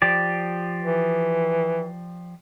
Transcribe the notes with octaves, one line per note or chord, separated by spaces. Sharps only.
F3 G4 D5
E3